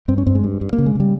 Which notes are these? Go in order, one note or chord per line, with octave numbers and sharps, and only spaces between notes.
G2 C4
C#4
G2 C4
G#3
G2
G2
A#3
C#3
G#3
C#3 G3